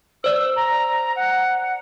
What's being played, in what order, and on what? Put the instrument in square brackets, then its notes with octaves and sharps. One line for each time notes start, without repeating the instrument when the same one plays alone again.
[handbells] C5 D5 [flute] E6
[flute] A#5
F#5